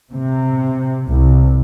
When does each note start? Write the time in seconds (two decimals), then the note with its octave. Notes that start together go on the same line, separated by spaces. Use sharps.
0.13 C3
1.08 C2